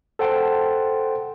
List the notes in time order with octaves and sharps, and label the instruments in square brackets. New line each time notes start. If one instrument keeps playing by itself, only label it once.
[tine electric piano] A4 C5 F#5 G5 A5 C6